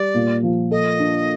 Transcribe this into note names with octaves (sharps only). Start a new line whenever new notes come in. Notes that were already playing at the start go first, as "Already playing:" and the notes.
Already playing: G3 D5
A#2
F3
A4 D#5
D4